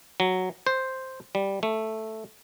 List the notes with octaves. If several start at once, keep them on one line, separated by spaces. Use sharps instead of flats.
F#3
C5
G3
A3